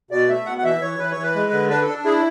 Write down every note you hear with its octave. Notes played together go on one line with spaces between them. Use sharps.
B2 D5
A3 E5
B2 F#5
F#5
E3 E5
E3 C#5
E3 B4
C#5
E3
B4
G#3
D3
D4 B4
A4
D4
E4 G#4